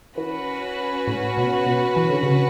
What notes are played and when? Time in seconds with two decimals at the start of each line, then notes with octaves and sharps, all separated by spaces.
0.18 E3 C#4 F#4 B4
1.07 A2
1.37 B2
1.66 B2
1.96 E3
2.10 D3
2.23 C#3